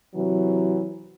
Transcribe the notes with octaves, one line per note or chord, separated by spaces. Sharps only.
C3 E3 F#3